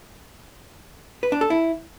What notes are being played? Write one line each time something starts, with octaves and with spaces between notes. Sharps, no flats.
B4
D4
A4
E4